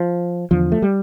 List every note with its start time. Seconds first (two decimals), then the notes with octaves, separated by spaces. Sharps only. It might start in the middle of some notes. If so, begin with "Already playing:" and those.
Already playing: F3
0.51 E2 D3 F3
0.72 A3
0.82 G3